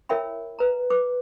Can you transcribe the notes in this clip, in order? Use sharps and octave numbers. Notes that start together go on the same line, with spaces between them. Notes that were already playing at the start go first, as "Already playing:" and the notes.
E4 A#4 C#5 E5 G5 B5
B4 A#5
B4 D6